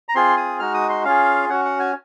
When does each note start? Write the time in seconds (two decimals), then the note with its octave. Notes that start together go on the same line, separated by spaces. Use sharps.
0.09 A#5
0.15 C4 F4 G#4 C6
0.37 D#6
0.60 G#3 D#4 F#4 F6
0.74 D#6
0.89 C6
1.05 C#4 F4 G#4 F5
1.49 C#4 F#4 F#5
1.65 F#5
1.79 G#5